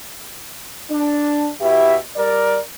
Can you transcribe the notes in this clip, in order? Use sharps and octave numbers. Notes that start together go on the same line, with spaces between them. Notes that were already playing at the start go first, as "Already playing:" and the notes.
D4
B2 E4 G4 E5
G3 A#4 D5